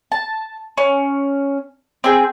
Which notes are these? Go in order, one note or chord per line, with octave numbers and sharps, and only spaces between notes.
A5
C#4
C4 G#4 G5